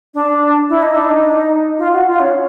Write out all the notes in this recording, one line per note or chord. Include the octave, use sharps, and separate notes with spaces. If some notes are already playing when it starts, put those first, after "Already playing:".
D4
E4
D#4
D4
D#4
F4
F#4
F4
C#4